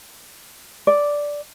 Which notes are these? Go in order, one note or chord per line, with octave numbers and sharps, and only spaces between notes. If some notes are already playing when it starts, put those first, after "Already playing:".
D5